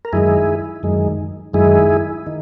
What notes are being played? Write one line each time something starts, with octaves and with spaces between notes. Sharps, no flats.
A#4
F#2 D#3 G#3 E4 G#4
F#2 D#3 G#3
F#2 D#3 G#3 E4 G#4
D#3